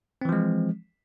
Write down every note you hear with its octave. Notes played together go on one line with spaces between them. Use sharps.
E3 F3 G#3 C4